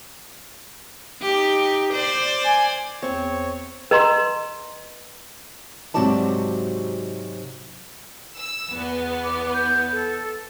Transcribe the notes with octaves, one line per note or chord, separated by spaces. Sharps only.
D#4 G4
C5 D5
G#5
E2 C4 C#5 C#6
B4 D#5 A#5 C6
G#2 C3 F#3 F#4 D5 A5
E6
E2 B3
D6
G6
A4